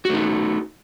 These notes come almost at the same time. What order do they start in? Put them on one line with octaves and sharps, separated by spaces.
F#4 A3 D#4